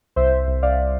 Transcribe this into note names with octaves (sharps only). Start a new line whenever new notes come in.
C2 C5 E5
C2
C2
C2 D5 F5